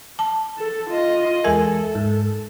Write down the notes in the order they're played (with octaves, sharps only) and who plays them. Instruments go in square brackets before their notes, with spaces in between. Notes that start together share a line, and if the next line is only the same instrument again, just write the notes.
[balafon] A5
[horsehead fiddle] A4
F4 D#5
[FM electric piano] E2 G#3 E5 [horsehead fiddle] A4 [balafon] A#4 G#5
[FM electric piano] G#2